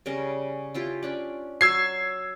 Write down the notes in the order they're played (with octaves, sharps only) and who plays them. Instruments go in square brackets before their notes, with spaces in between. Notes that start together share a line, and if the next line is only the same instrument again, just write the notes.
[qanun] C#3 G3 A#4
E4 F4 G4
C#4 D4 D5
[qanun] F#3 [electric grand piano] E6 G#6 C7